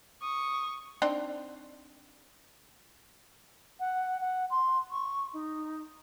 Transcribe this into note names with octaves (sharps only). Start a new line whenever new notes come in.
C#6 D#6
C4 D4 D#4
F#5
F#5
C6
C#6
D#4